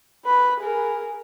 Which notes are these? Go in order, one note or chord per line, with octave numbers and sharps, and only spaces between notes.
B4 B5
G#4 A#4